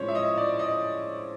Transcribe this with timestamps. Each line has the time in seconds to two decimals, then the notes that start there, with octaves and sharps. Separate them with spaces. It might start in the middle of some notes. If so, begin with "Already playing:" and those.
Already playing: A2 F3 G#3 C#4 C5 C#5
0.08 E5
0.15 D#5
0.38 D5
0.59 D#5